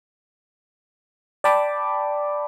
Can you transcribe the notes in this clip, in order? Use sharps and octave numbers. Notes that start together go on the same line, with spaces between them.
D5 G5 A5 B5 D6